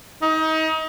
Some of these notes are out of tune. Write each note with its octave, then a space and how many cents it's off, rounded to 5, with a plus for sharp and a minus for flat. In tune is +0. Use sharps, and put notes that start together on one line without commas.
D#4 +30